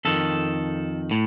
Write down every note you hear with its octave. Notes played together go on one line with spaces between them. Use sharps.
F2 D#3 A4
A2